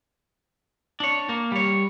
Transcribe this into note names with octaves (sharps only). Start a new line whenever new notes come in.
D4 C#5
A#3
G3 C#5